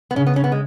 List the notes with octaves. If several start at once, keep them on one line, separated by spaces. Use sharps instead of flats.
B3
C#3 C#4
B3
C#4
B3
G#3